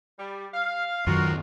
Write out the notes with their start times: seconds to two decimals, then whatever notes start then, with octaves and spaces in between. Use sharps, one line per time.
0.19 G3
0.54 F5
1.07 F#2 D#3 F#3 F4 F#4 A#4